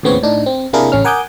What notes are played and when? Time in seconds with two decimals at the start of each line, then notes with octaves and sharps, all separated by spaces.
0.03 D#2 A2 C#3 B3 C4 C#5
0.23 A2 D4 D#4
0.46 C4
0.73 C3 A#3 D4 E4 G#4 A#4
0.92 A1 C#3 C#4 F6
1.04 A#4 F#5 G#5 D6 D#6 G6